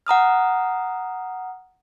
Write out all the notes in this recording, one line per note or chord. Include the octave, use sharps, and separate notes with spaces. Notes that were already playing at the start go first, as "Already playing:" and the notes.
F#5 A#5 D#6 F6